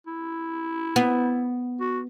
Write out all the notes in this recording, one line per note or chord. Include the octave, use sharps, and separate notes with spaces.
E4
B3
F#4